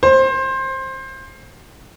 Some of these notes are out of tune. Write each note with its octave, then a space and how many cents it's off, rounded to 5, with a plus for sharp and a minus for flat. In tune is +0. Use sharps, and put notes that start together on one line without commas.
C5 +20